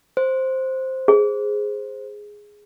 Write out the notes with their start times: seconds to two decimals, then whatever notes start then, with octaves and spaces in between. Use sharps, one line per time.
0.17 C5
1.08 G#4